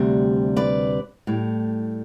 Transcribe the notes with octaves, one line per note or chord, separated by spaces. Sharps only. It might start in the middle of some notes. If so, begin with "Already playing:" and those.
Already playing: D2 C3 G3
B4 D5
A2 G3